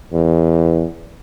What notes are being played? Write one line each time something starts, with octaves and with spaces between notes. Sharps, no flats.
E2